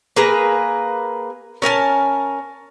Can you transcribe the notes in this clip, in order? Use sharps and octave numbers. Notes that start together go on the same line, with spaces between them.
A#3 G#4 B4 A#5
C#4 A#4 G#5 A5